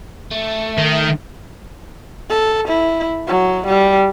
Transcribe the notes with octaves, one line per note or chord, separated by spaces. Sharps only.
A3
D#3
A4
E4
F#3
G3